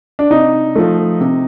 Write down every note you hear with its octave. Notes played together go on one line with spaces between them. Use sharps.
D4
C3 D#4
F3 A3
C3